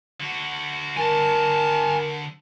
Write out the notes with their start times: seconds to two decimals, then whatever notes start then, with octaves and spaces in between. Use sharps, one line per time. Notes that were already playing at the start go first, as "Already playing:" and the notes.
0.20 D3 F#4
0.97 A#4 G#5 A5